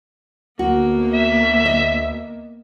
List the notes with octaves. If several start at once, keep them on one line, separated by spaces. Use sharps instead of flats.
D2 A#3 B3 F#4
E5
D#5